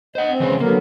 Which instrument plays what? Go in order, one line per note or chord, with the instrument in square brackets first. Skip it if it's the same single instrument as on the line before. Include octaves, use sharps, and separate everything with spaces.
[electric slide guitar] C5 F#5 [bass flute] D#5
[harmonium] C4
[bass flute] C#3 [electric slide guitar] E3 G#3 B4
[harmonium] D3 F#3 B3 [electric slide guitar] A#3 [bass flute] A#4